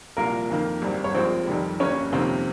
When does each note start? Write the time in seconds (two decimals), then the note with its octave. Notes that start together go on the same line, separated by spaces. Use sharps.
0.17 C2 A#2 F3 A#3 A#4
0.50 F2 D#3 A#3
0.82 G#1 G2 G3 C4
1.04 C#5
1.14 A#1 A#2 G#3 C4 C5
1.47 F1 F2 D#3 G3
1.80 G1 G2 G3 A#3 C#4 C#5
2.12 G1 F2 C3 D#3 A#3 C4 C5